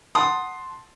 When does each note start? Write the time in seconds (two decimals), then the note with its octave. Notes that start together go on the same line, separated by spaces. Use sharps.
0.15 F#5 A5 C6 D#6